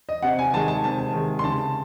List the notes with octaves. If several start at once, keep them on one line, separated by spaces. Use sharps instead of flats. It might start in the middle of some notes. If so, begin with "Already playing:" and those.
D#5
C3 F#5
G#5
D#3 G#3 A5
A5
C3 A5
D#3 G#3
C6
C#3 A5